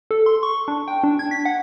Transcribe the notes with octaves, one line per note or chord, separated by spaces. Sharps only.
A4
C6
C#6
D4
G5
D4
G#6
B6
F#5